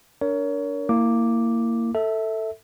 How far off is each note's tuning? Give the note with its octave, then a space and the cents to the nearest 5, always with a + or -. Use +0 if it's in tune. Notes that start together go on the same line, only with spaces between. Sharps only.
D4 -25 A#4 +0 C#5 +25
A#3 -20 E4 +0 D6 +0
A4 +15 E5 -20